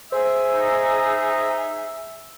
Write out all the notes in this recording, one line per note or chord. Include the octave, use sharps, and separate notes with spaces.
G#4 C5 E5
D#4